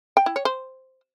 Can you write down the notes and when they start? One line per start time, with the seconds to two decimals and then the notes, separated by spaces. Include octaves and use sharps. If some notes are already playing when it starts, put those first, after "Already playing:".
0.17 G5
0.26 E4
0.36 C#5
0.45 C5